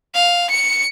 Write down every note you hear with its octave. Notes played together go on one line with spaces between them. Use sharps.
F5
C#7